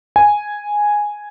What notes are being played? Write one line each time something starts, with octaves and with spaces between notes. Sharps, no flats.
G#5